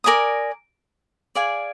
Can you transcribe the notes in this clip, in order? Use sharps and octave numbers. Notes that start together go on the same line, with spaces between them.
A#4 D5 G#5 D#6
G#4 D5 F5 G#5